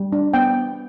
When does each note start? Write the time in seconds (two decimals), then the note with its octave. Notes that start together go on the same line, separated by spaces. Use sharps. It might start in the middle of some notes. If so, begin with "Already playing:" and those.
Already playing: G3
0.13 D4
0.34 B3 G5